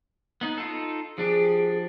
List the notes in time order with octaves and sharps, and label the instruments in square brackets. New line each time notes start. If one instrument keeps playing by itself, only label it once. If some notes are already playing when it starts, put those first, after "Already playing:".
[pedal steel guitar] B3 D#4
D#4 F4 A4
[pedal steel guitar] F3 D4 G4 [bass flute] G#4